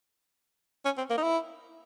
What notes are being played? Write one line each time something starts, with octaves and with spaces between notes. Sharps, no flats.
C#4
C4
A#3
D#4
E4